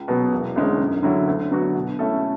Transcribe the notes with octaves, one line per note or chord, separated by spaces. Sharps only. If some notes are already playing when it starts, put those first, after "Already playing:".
Already playing: C#2
B2 F#3 B3
E1
D2 D3 G#3 C#4
F#2
D3 F#3 C#4 E4
D2
D3 F#3 B3 F#4
B2
A3 C#4 E4 A4